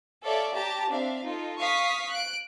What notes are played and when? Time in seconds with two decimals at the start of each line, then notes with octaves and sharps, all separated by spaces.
0.24 A4 C#5 D5 E5 F5
0.55 G4 A5 A#5
0.89 C4 D4 E5 F5
1.23 D#4 F4 A4
1.59 F5 C#6 D#6 B6
2.10 F#6 D7